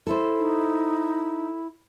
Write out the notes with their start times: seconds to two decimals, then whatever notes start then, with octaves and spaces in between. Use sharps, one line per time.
0.07 E4 A4 C5
0.39 D#4